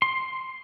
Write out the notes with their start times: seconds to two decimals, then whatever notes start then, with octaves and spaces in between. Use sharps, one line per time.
0.02 C6